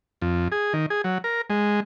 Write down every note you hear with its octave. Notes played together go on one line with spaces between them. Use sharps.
F2
G#4
D#3
G#4
F#3
A#4
G#3